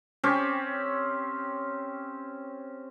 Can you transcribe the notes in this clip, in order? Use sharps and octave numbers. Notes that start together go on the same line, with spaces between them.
C4 C#4 G4